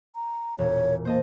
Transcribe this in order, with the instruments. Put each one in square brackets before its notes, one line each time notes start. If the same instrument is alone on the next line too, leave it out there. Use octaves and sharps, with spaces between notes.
[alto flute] A#5
[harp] E1 A#2 [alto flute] C#5
[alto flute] A#3 [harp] C5 D#5 A5